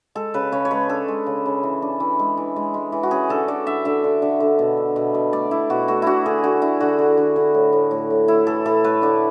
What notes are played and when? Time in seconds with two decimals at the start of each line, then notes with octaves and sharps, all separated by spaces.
0.15 G#3 A4
0.34 C#3 B4
0.52 C#3 C#5
0.65 C#5
0.71 G#3 B4
0.89 D4 A4
1.08 G#3
1.26 C#3
1.46 C#3
1.63 E3
1.82 D4
2.00 E3
2.19 G#3
2.37 E3
2.56 G#3
2.74 G#3
2.92 E3
3.03 F#4
3.11 C#4 G#4
3.29 D3 A4
3.48 D3 D5
3.66 D3 E5
3.85 D3 E5
4.04 D3
4.22 D3
4.40 D3
4.59 B2
4.77 D4
4.96 B2
5.14 B2
5.33 A3 D5
5.51 D4 E4
5.70 B2 F#4
5.88 A3 F#4
6.02 D4 E4 F#4
6.26 D3 G#4
6.43 D3 F#4
6.62 D3 E4
6.80 D3 F#4
6.98 D3
7.17 D3
7.36 D3
7.54 A2
7.73 A2
7.91 A2
8.10 A2
8.28 A3 E4
8.47 E3 A4
8.65 A2 A4
8.84 A3 B4
9.02 D3 D5